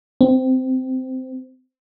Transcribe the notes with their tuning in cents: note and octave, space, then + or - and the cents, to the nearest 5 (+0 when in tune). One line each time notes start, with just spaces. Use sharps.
C4 -15